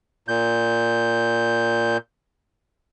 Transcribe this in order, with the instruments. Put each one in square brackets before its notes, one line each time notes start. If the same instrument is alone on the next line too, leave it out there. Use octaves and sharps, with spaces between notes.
[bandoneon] A#2 G6